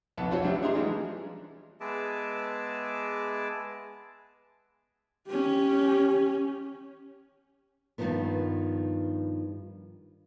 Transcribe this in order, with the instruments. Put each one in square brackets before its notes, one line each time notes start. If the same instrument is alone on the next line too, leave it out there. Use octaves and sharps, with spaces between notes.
[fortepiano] B1 F2 B4 F#5 A5
C4 F4 F#4 C5 C#5
E3 F#3 G3 D4 G4 E5
D4 D#4 G#4 E5 A#5 C6
E3 F3 G3 G#3 D4
[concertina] G#3 B3 G#4 E5 A5 D6
[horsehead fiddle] C#4 G4
[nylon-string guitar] G2 A#2 D#3 F3 B3